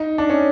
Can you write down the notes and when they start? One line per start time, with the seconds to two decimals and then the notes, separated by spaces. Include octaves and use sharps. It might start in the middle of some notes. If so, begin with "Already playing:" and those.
Already playing: D#4
0.18 D4
0.30 C#4